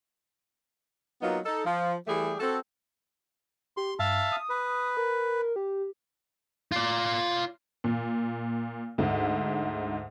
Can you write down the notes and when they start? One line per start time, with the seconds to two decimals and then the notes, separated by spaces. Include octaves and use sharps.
1.22 F#3 A#3 B3 D#4 F4
1.45 D#4 A4
1.66 F3
2.07 E3 G3 A3 G4 G#4
2.40 C4 F#4 A4
3.77 G4 C6
3.99 G2 E5 F5 A5
4.32 D#6
4.49 B4
4.97 A#4
5.56 G4
6.72 F4 D5
7.84 A#2
8.98 D2 G#2